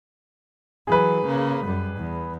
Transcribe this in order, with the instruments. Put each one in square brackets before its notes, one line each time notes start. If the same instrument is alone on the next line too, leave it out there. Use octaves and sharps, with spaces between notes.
[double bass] E3 F#3 [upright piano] G#4 B4
[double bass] C#3 A#3
F#2 G3
E2